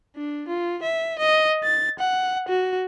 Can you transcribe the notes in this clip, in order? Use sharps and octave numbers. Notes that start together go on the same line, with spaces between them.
D4
F4
E5
D#5
A6
F#5
F#4